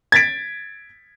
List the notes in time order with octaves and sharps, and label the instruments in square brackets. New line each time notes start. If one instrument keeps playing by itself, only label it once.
[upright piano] G#6 A6 B6 D7